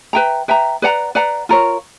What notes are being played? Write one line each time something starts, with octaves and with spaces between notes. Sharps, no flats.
B4 E5 G5 A#5
B4 E5 G5 A#5
B4 D5 F#5 A#5
B4 D5 F#5 A#5
F4 A#4 C#5